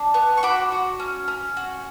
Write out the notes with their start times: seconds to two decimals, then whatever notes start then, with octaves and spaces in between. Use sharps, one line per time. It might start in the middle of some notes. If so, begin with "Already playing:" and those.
Already playing: D4
0.14 B3
0.37 C#6
0.43 F#4 B5 D6
0.72 F#4
1.00 C#4
1.28 C#4
1.57 F#4